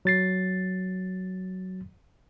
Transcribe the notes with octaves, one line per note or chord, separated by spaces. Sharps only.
F#3 A6 C7